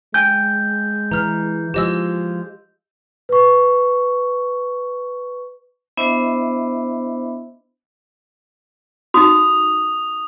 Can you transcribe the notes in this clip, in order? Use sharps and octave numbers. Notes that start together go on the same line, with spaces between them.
G#3 G5 G#5 G6 G7
E3 A#5 F6
F3 G#3 F4 G4 D#5 E6
B4 C#6
B3 D4 E4 C5 D#5 E5
D#4 F#4 D#6